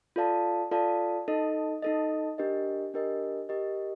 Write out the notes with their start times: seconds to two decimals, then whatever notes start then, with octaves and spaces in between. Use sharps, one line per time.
0.16 F4 A4 D5 F5 A5
0.71 F4 A4 D5 F5 A5
1.28 D#4 A4 D#5
1.82 D#4 A4 D#5
2.38 D4 G4 A#4 D#5
2.94 D4 G4 A#4 D#5
3.49 G4 A#4 D#5